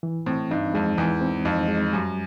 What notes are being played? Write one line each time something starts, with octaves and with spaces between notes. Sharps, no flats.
E3
A2 C4
G2 D#4
F2 G#3
E2 E3
C4
F2 D#4
G#3
F#2 G3